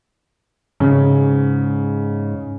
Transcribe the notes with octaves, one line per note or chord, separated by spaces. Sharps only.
G#2 C#3